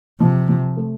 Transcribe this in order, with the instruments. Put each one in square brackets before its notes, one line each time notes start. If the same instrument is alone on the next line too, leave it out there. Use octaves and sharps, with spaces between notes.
[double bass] C3 [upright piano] F3
[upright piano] F3
A3